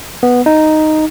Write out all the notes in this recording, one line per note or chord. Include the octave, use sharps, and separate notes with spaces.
B3
D#4